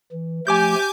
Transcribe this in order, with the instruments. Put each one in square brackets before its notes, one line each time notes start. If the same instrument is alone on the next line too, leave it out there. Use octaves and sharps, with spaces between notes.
[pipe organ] E3
[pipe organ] F3 A3 [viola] G4 [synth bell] G#5 D6 G6